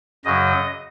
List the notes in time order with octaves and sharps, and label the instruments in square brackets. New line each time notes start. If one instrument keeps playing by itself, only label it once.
[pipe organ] F#2 C#3 F#3 D#5